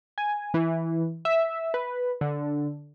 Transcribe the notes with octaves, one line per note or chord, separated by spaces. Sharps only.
G#5
E3
E5
B4
D3